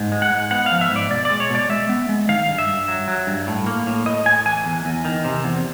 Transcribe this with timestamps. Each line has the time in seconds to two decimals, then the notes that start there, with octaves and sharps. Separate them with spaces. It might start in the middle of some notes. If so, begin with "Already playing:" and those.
Already playing: G#2
0.12 G#3
0.22 F#5
0.32 G#2
0.51 B3 F#5
0.66 F5
0.71 F3
0.81 E5
0.91 G#2
0.96 D5
1.11 B2 D5
1.25 D5
1.30 G#3
1.40 C#5
1.50 B2 D5
1.69 G#3 E5
1.89 B3
2.09 G#3
2.29 D#3 F5
2.48 G2
2.58 E5
2.68 G2
2.88 F#3
3.08 F#3
3.27 G2
3.47 A2
3.67 A#3
3.87 A2
4.06 A2 D#5
4.26 A2 G#5
4.45 E3 G#5
4.65 E2
4.85 E2
5.05 D#3
5.25 C3
5.44 E2